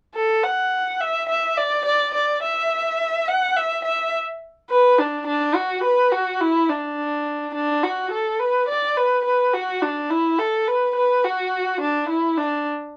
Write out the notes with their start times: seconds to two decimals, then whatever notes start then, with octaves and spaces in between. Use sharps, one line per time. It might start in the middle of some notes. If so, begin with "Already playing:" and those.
0.15 A4
0.44 F#5
1.01 E5
1.29 E5
1.57 D5
1.85 D5
2.14 D5
2.43 E5
3.28 F#5
3.56 E5
3.85 E5
4.70 B4
4.98 D4
5.27 D4
5.55 F#4
5.84 B4
6.12 F#4
6.41 E4
6.69 D4
7.55 D4
7.83 F#4
8.12 A4
8.40 B4
8.69 D5
8.97 B4
9.25 B4
9.54 F#4
9.82 D4
10.10 E4
10.39 A4
10.67 B4
10.96 B4
11.24 F#4
11.81 D4
12.09 E4
12.38 D4